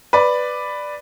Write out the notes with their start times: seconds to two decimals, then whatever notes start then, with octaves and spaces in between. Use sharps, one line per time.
0.13 B4 D5